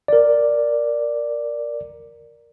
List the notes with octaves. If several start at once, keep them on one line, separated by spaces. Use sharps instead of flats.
A#4 D5